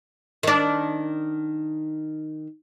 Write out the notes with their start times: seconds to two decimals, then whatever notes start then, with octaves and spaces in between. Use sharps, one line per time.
0.43 D#3 D4